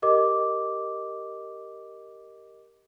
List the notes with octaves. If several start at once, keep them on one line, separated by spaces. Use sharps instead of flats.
G4 A#4 D#5 D6